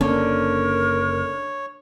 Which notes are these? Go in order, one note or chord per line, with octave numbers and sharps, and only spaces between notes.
F#1 D3 A#3 C#4 A#4 C#5